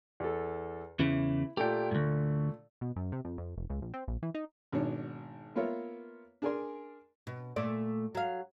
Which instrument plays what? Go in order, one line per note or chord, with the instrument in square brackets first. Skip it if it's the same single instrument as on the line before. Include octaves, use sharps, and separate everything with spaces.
[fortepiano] E2 A4
[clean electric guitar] E2 C#3 E3 [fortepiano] E4
[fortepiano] A#2 A3 [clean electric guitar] G4 G5
[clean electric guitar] D2 G#2
[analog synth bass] B2
F#2
C3
F2
F2
F1
C#2
A#1
C4
A#1
E3
D#4
[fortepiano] G#1 B2 D#3 D4 C#5
A#3 B3 F4 A#4 C#5 E5
D4 G#4 A#4 D5 G#5 C6
[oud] B2
A#2 A3 D5
F#3 F5